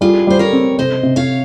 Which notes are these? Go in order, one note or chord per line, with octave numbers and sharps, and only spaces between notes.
G3 F4 G#4
G3 C5
A#4 C#5
C4
C3 C5 D#5
C3
C#5 F5